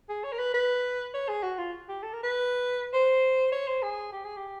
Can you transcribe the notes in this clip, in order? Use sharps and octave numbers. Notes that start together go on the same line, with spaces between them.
G#4
C#5
A#4
B4
B4
C#5
G#4
F#4
F4
G4
A4
A#4
B4
C5
C#5
C5
G#4
G4
G#4
G4